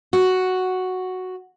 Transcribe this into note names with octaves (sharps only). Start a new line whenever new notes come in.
F#4